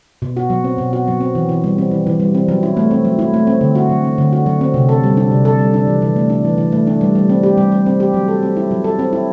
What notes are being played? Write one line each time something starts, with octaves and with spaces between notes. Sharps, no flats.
B2
F#4
F#3
C4
B2
F#4
F#3
C4
E3
E3
G3
C4
E3
E3
G3
C4
F#3
E4
A3
C4
F#3
E4
A3
C4
D3
F#4
F#3
C4
D3
F#4
F#3
C4
C3
A4
G3
D4
C3
A4
G3
D4
E3
E3
A3
D4
E3
E3
A3
D4
G3
G3
C4
G4
G3
G3
C4
G4
F#3
A4
C4
E4
F#3
A4
C4
E4